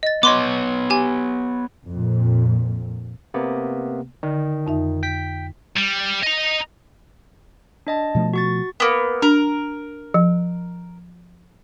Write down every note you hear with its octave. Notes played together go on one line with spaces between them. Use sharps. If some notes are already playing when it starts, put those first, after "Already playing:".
D#5 A6
B3 C#5 D#5 C6 D6
G4 G#5
F2 A#2
C3 A#3 B3
D3 D#3
F2 D#4 E5
G5 B6
G3
D#5 A#5
D4 D#5 A5
B2 F3 A3
F#4 C#6 A6
A#3 B3
D4 A#4
F3